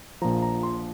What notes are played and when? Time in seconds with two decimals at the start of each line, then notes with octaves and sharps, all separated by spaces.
0.22 A#1 A#2 F3 A#5
0.42 A#5
0.63 C6